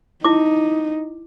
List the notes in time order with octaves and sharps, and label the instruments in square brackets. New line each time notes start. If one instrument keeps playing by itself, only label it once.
[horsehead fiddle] D#4 [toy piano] E4 D6